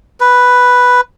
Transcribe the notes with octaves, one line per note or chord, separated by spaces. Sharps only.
B4